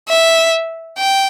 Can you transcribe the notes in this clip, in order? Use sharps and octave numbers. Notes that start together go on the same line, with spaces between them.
E5
G5